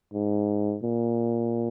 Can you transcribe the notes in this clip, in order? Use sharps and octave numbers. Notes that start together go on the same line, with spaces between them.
G#2
A#2